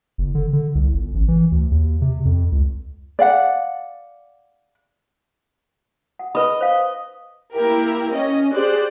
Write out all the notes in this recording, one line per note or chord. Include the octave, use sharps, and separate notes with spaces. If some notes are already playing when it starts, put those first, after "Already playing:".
F#1
D3
D3
C2
G1
A1
E3
D2
D#2
C3
F2
C#2
D5 F5 F#5
F#5
B4 D#5 B5
C5 F5
A#3 E4 G4 A#4
C#4 D#5
G4 G#4 C5 D5 F#6